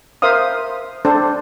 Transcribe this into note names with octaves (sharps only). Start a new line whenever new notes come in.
A#4 C5 E5 F5 D#6
D4 A4 C5